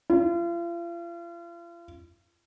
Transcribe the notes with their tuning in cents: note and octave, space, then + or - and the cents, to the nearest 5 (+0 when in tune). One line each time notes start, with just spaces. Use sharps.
F4 -40